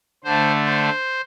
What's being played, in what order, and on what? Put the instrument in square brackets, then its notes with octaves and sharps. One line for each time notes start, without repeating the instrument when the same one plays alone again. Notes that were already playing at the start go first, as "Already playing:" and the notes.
[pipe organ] D3 A3 C5
C5